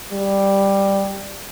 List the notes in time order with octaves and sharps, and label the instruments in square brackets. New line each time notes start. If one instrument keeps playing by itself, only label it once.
[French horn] G3